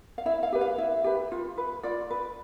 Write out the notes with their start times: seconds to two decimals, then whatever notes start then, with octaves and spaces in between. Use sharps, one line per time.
0.18 F5
0.26 E4 E5
0.43 F5
0.53 G4 B4
0.61 F5
0.78 E4 E5
1.04 G4 B4
1.32 F4
1.58 B4
1.83 F4 D5
2.10 B4